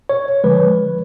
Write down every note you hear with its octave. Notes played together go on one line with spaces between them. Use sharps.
C#5
D3 F3 G#3 B4